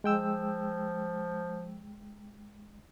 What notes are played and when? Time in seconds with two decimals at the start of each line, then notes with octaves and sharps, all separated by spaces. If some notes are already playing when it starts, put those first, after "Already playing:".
0.04 F3 G#3 G5 E6